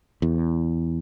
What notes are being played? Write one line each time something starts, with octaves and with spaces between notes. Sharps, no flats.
E2